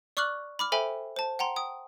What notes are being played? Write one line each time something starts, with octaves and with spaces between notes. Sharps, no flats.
D5 C#6 D6 F6 F#6 F#7
B5 D6 F6
A4 C5 E5 G5 G#5 B5
C5 A5
F#5 G5 A#5 C6
G5 D#6